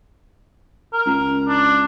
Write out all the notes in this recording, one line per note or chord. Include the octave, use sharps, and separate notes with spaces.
A#4
C#2
D4